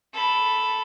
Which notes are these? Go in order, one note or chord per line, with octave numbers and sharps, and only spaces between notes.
A4 B5